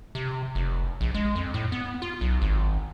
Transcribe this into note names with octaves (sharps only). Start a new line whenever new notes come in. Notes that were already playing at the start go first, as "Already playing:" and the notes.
C3
F1
A#1
G#3
F2
A2
B3
F4
B1
G#1